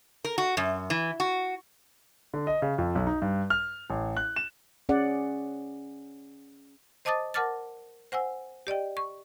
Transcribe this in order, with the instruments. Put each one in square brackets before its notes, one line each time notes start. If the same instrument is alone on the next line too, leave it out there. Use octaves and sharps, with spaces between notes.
[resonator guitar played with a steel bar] A#4
F#4
F#2
E3
F#4
[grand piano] D3
D#5
C#3
F2
B1
D#4
G2
F6
A1
F#6
E7
[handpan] C#4 G#4 D5 F#5
[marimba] C5 D#5 A5 D6 D#6 A6
A#4 F#5 A5 D6 F6 A6
C5 F#5 G#5 E6
G4 D5 D#5 G5
C#6